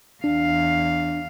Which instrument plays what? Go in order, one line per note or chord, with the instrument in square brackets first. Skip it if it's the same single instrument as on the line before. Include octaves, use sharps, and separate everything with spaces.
[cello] E2 F5 [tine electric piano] D4